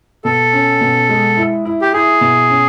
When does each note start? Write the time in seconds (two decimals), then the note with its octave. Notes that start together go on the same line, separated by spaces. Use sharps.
0.24 B2 A4
0.53 C#4
0.81 B2
1.09 G#3
1.37 E4
1.65 E4
1.81 G4
1.93 E4 G#4
2.21 B2
2.49 C#4